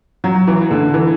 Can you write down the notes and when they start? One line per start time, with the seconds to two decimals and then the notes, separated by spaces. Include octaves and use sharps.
0.24 F#3
0.47 E3
0.71 D3
0.94 E3